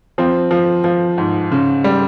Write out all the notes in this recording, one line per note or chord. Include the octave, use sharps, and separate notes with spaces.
F3 C4
F3
F3
G#2
C#3
G3